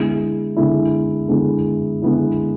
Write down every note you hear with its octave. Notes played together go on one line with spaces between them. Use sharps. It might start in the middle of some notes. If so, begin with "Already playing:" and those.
Already playing: D3 G#3 B3 E4
D3 G#3 B3 E4
D3 G#3 B3 E4
D3 G#3 B3 E4